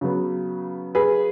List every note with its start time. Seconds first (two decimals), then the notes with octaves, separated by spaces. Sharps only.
0.01 C#3 F#3 B3
0.95 G#4 B4